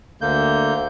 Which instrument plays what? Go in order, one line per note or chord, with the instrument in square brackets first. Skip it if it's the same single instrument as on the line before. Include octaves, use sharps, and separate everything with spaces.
[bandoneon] D2 D3 A#3 G6